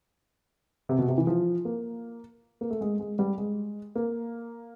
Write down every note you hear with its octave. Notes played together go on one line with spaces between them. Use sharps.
C3
B2
C3
E3
F3
A#3
A#3
A3
G#3
G#3
G3
G#3
A#3